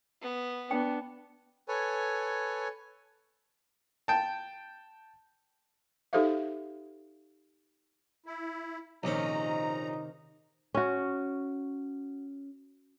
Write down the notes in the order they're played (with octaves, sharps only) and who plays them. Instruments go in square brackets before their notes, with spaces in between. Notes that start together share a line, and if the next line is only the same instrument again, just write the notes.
[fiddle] B3
[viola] B3 D4 [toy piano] G5
[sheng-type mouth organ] A4 B4 C#5 G#5
[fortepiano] G5 A5
[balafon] D#4 G4 A4 C5 E5 F5
[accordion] E4
[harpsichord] A#1 C#4 [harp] C3 D#3 C4 [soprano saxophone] D#4 [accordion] A#5
[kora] C#4 F#4